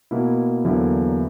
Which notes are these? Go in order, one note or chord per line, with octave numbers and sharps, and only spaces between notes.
B2 A#3 E4
E2 D3 F#3 A#3 E4